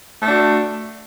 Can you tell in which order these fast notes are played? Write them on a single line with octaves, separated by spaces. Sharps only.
A3 D4 F#4